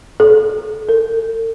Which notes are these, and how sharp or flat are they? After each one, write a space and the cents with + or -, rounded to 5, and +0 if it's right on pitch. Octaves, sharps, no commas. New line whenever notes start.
A4 -35
A4 +45